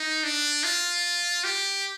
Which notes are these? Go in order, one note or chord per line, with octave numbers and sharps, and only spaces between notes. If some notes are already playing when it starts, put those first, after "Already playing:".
Already playing: D#4
D4
F4
G4